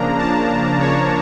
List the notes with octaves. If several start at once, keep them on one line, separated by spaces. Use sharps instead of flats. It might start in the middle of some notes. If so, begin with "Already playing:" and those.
Already playing: C#3 F3 A#3 D4 A#5
A5
C#5